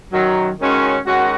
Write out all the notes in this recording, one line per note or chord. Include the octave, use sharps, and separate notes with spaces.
F#2 D#3 F#3
D#3 G#3 C#4 F#4
D#3 G#3 C#4 F#4